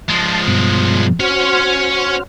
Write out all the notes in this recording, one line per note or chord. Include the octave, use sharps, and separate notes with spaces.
F3 G#3 A5
G2 B2
C#4 F#4 C5 C#5 F6